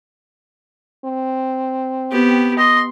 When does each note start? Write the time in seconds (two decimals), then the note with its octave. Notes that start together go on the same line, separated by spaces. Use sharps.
1.05 C4
2.11 B3 G4
2.58 D#5 C6